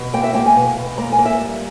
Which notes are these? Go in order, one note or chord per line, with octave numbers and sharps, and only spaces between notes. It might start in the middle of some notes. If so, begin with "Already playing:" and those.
Already playing: B2
A#3 G5
E5
A#3 G5
G#5
B2
B2
A#3 A#5
G#5
A#3
E5
G3